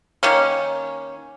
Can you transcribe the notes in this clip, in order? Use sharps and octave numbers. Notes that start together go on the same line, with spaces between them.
D#3 A#3 C#4